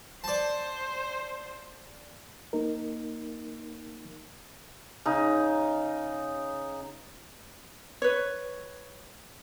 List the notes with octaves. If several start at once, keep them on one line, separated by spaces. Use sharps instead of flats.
C5 D5 A5
A#3 D#4 A#4
C#3 D#4
B4 C#5